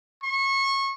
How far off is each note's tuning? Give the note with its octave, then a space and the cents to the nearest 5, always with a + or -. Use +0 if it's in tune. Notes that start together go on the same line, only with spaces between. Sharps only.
C#6 -25